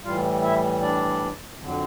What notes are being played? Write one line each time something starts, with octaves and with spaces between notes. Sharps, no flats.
A2 E3 G3 F4 F5
E4 E5
D4 D5
F2 D3 F#3